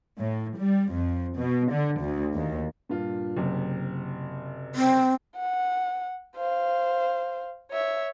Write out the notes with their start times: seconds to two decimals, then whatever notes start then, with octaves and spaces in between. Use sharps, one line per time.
0.19 A2
0.59 G3
0.93 F2
1.38 B2
1.72 D3
2.01 D2
2.34 D#2
2.89 G2 A#2 F4
3.36 F#1 C3
4.75 C4
5.37 F#5
6.36 C5 F5
7.71 C#5 E5